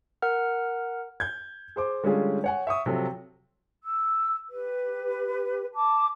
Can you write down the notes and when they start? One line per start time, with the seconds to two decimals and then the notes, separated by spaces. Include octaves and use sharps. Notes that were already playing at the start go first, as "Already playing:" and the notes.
0.22 A#4 F#5 F6
1.20 G6 G#6
1.76 G#4 C5 D6
2.03 D3 G3 G#3 C#4 F4 G#4
2.44 C#5 F#5 G#5
2.67 E5 C#6 D#6
2.86 C3 F3 F#3 A4
3.82 E6
4.49 G4 B4
5.74 A5 D6